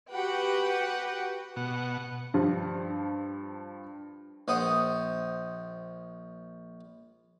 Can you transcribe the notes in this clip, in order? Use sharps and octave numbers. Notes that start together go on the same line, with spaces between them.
F#4 G4 B4 F#5 G5
B2 F#5
G2 F3 G3
A#1 C5 F#5 D#6